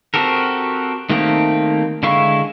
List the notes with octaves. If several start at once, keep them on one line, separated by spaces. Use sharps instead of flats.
C4 F#4 G4 A4 A#4
D#3 A3 A#3 C4 G4
D3 G#3 E4 F5 C#6